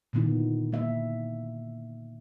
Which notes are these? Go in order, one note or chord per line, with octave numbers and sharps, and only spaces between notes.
A#2 D3 D#3 B3 E4
A#3 E5